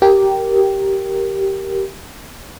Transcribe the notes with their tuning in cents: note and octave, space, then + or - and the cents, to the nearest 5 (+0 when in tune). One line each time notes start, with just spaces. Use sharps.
G4 -10 A#4 +0